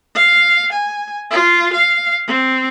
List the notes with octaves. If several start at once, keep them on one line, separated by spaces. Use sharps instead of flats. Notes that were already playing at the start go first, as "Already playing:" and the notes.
F5
G#5
F4
F5
C4